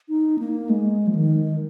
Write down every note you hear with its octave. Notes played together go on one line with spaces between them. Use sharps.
D#4
A#3
G#3
F3
D#3